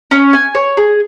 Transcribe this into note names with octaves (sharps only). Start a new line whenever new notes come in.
C#4
G#5
C#5
G#4